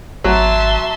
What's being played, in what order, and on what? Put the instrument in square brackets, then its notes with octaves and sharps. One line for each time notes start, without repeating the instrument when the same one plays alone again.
[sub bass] G#1 [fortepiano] F#3 [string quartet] E5 A5 C6